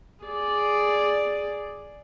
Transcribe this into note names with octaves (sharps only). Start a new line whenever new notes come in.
G#4 D5